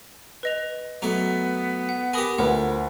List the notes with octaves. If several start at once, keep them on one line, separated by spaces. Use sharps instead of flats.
B4 D#5 F7
F#3 A3 B3 A#5
F#5
G4 A#4 G#5 B5 D#6
D2 F3 A#4 B4 F#5